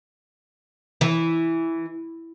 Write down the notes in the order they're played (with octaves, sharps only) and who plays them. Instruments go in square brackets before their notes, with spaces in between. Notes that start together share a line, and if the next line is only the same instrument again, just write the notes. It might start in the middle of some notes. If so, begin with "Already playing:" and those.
[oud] E3